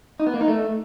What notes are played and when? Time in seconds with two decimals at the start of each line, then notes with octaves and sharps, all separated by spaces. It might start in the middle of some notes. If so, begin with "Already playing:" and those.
0.20 D#4
0.27 B3
0.34 A#3
0.41 D#4
0.48 A3